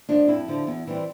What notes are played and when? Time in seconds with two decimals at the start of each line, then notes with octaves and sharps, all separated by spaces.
0.09 F3 A3 D4 F4
0.28 F2 E4
0.48 D3 F3
0.67 E2
0.87 E3 G3 C4